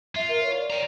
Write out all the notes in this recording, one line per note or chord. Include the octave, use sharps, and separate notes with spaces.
F4 E5
A#4
C#5
D5
G5 A#5